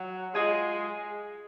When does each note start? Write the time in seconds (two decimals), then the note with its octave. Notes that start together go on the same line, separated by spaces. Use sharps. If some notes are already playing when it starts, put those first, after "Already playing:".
Already playing: F#3
0.34 G#3 F4 G#4 D#5 G#5